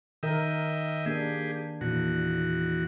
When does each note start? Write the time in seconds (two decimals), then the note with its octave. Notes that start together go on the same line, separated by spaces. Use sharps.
0.23 D#3 A#4 D#5 E5 G5
1.06 A#3 D4 G4 G#4
1.81 E2 A#2 F#4